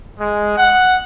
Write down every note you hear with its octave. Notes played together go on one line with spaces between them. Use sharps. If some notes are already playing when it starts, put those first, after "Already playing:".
G#3
F#5